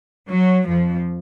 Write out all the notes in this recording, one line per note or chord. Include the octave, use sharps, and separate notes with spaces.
F#3
F2 F3